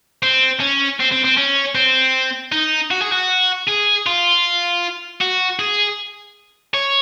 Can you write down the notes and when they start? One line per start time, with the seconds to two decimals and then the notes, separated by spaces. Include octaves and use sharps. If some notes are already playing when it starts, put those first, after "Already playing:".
0.23 C4
0.60 C#4
1.00 C4
1.11 C4
1.24 C4
1.37 C#4
1.75 C4
2.52 D#4
2.91 F#4
3.01 G#4
3.12 F#4
3.67 G#4
4.06 F4
5.21 F#4
5.59 G#4
6.74 C#5